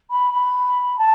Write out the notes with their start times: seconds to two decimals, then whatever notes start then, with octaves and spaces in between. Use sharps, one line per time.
0.10 B5
0.32 B5
0.98 A5